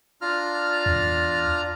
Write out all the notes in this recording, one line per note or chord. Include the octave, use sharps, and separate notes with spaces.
D4 F4 A#5 F6
E2